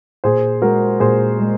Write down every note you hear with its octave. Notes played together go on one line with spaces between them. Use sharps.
A#2 G#4 C5
G#3 F#4 A#4
A#2 G#4 C5
G#3